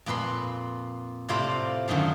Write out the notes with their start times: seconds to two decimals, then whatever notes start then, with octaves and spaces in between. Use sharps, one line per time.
0.06 F2 A#2 B4 B5 C6
1.29 A2 C3 F4 C5 D5 B5
1.88 F#2 A2 D3 D#3 F3